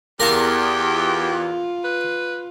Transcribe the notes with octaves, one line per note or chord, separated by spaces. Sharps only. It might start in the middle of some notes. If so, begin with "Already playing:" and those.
E2 G4 A#4 F5 A5
F4
B4